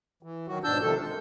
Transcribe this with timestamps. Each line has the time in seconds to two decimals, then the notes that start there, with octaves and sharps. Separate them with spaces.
0.23 E3
0.48 D#3 F#3 F#4
0.64 G#2 B2 D4 A5 E6 G6
0.82 C3 D#3 F3 A4
1.01 G#3